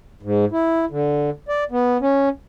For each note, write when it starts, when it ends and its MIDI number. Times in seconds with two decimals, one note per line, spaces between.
0.23 0.45 44
0.52 0.85 64
0.90 1.30 50
1.48 1.64 74
1.71 1.97 59
2.01 2.29 61